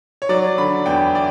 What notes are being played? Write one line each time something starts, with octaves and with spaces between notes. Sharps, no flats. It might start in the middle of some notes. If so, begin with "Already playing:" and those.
C#5
F#3 D5
D3 B5
E2 G5
D5